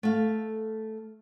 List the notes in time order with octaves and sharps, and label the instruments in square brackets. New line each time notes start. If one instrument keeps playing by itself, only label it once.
[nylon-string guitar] A3 F5